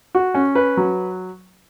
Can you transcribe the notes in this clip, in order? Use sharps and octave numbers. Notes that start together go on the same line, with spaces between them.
F#4
C#4
B4
F#3